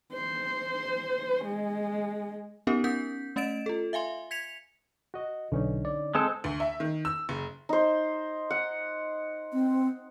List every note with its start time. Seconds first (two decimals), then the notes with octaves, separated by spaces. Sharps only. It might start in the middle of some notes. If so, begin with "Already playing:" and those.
0.12 C5
1.44 G#3
2.67 B3 C#4 D#4 G4 A#4
2.84 C#4 A#4 G6 B6
3.36 A3 C#4 D#5 A6 D7 E7
3.66 F4 A4
3.93 E5 F5 G#5 C6
4.31 G#6 B6 C#7 F7
5.14 F#4 D#5
5.52 B1 D3 C#4 D#4
5.85 D5
6.15 G#3 C4 A4 G#5
6.44 D2
6.60 E5
6.80 D#3
7.05 E6
7.29 F#1
7.69 D#4 C5
8.50 F#5
9.53 C4